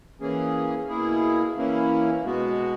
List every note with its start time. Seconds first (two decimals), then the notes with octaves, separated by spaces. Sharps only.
0.20 E3 A#3 C#4 G#4
0.88 B2 A#3 E4 G#4
1.56 E3 A#3 C#4 E4
2.23 B2 G#3 B3 F#4